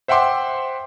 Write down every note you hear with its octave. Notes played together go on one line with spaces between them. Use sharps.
C5 E5 F#5 G5 C6 D6